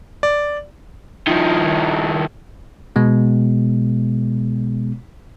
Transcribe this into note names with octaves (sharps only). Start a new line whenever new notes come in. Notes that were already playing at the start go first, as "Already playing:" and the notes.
D5
D#3 F3
B2 G#3 B3